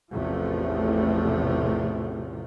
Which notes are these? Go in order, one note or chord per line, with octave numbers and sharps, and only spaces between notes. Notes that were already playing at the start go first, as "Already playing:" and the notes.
A1 E2 C3 F3 A3